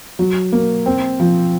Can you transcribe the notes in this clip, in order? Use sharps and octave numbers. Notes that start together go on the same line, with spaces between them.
F#3
A#3
C4
F3